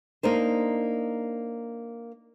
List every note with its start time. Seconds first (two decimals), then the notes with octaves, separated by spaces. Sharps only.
0.23 A#3 D4 D#4 C5